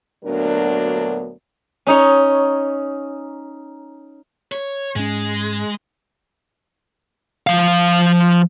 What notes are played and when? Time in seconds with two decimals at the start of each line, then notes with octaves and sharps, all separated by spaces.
0.25 D2 A#2 F#3 B3 D4 A#4
1.87 C#4 D#4 C#5
4.52 C#5
4.96 G#2 G#3 C#4
7.47 F3 F5